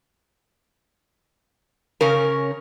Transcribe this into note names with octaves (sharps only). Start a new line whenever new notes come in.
C#3 C#4 A#4